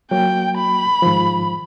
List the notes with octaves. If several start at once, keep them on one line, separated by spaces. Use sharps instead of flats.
F#3 A#3 F#4 G5
B5
G#2 D#3 F3